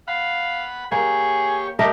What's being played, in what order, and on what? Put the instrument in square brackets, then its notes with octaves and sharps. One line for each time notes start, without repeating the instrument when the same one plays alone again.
[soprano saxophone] F5 [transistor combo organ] F#5 B5
[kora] A#3 [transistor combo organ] G4 C#5 [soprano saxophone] G#4
[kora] A3 A#4 D#5 [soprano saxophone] G4